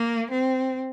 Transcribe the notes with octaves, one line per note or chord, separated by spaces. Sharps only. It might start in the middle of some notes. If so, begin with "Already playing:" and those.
Already playing: A#3
C4